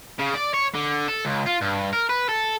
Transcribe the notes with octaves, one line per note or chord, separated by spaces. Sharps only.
C#3
D5
C#5
D3
A4
C#2
F4
G2
A#4
B4
A4